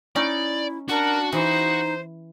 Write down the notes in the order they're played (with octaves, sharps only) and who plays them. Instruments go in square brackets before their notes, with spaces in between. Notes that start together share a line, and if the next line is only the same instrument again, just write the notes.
[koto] C#4 D#4 [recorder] E4 [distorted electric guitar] D5
[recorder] D4 [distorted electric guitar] F#4 [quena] A#4
[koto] E3 [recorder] D#4 [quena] C5